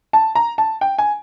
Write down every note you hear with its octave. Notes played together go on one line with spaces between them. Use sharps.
A5
A#5
A5
G5
G#5